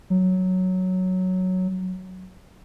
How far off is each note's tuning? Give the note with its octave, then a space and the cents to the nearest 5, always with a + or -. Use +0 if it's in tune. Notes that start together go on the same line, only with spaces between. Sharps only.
F#3 +0